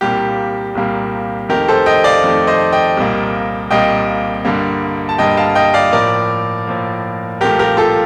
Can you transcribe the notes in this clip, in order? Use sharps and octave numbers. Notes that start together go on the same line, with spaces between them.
C2 A#2 G3 A#3 G4
C2 A#2 G3 A#3
F2 D#3 A3 G4 A#4
A4 C5
D#5 G5
D5 F5
F2 D#3 A3
C5 D#5
D#5 G5
C2 A#2 G3 A#3
C2 A#2 G3 A#3 D#5 G5
G2 D3 G3 A#3
A5
G2 D3 G3 A#3 D#5 G5
F5 A5
D#5 G5
D5 F5
A2 F3 A#3 A#4 D5
A2 F3 A#3
C2 A#2 F3 A3 G4 A#4
G4 A#4
F4 A4